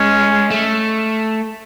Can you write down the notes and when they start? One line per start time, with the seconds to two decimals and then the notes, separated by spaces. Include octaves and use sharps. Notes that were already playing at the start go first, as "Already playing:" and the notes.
Already playing: G#3 C#4
0.51 A3